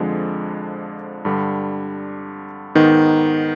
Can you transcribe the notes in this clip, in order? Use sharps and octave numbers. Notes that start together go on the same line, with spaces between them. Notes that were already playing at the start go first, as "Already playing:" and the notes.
Already playing: F2 D3 F3 G#3
G2 D3 G3
G#2 D#3 B3 D#4